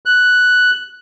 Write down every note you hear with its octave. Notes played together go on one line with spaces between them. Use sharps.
F#6